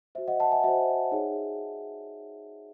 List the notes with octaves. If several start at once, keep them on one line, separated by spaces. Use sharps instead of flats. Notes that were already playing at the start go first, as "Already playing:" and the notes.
F#4 C5 E5
D#5 F#5
F#5 A5
E5 G#5
F#4 C5 E5
D#4 G#4 C#5